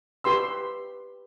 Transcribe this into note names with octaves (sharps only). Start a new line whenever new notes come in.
G4 B4 C6 E6